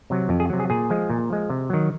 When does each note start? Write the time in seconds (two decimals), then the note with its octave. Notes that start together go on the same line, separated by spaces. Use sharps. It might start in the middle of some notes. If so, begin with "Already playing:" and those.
0.10 C3 F#3
0.29 F2
0.40 G#4
0.50 C3 F#3
0.60 G#4
0.70 A#2 G#4
0.90 F3 G#3
1.10 A#2
1.30 F3 G#3
1.50 C3
1.70 D#3 F#3